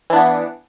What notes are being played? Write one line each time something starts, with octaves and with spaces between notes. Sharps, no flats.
E3 B3 D4